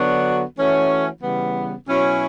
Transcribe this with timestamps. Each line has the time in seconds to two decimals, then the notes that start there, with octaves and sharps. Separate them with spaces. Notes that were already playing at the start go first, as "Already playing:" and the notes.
Already playing: D3 F#3 B3 D4 F#4
0.56 E3 A3 C#4 F#4
1.21 C#3 E3 G3 B3
1.86 B2 F#3 C#4 E4